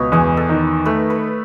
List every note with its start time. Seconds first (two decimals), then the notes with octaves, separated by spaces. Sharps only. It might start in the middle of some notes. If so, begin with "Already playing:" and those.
Already playing: C#2 B2 B4 C#5 D#5
0.12 E2 G#4
0.37 A4
0.49 D#3
0.86 A3 B4
1.10 B4